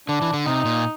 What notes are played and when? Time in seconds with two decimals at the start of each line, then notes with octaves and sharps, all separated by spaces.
0.09 D3 D4
0.22 E3
0.34 D3
0.46 C3 D#4
0.65 A#2